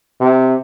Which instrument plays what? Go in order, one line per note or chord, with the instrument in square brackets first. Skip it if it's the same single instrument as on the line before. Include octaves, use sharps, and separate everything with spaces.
[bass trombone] C3